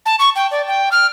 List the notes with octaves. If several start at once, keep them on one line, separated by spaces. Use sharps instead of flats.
A5
C#6
G5
D5
G5
F6